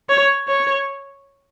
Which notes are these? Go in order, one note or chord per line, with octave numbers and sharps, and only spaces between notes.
C#5
C#5